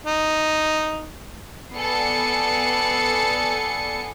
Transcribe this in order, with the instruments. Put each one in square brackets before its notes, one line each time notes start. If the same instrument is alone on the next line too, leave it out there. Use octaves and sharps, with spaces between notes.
[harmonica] D#4
[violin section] B3 A4 D5 G#5 C7 C#7